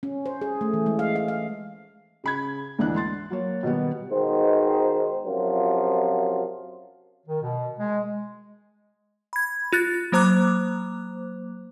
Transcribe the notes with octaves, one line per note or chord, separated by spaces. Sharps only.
C#4
C5
G#4
A3
E3
G#3
F5
F5
F5
C#3 B5 G#6
D2 G#2 E3 D4 F#6
C6 A6
F#3 A#3 C#5
B2 D#3 G3 B3
G#2 B2 D#3 C5
F#2 C3 F3 F#3 F4
D#3
B2
G#3
B5 G#6
F4 F#6 A6
F#3 A#3 C5 A#5 D6 F#6